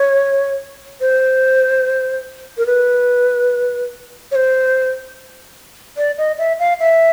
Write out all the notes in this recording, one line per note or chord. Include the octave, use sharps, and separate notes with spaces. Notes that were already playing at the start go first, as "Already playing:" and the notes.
Already playing: C#5
C5
A#4
B4
C#5
C5
D5
D#5
E5
F5
E5